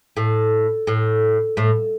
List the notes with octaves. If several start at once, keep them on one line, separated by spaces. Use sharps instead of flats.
A2
A2
A2